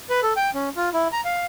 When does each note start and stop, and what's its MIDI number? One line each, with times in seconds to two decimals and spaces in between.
0.10 0.21 71
0.23 0.33 69
0.36 0.50 79
0.54 0.69 61
0.76 0.90 65
0.93 1.08 64
1.12 1.21 82
1.25 1.46 77